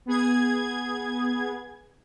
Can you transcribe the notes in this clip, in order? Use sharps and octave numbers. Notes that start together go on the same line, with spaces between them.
B3 G#4 G#6